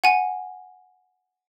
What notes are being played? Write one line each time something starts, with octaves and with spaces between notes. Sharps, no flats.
F#5 G#5